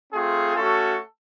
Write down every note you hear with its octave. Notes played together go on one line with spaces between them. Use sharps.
A3 C4 F4 G#4
A3 C#4 F#4 A4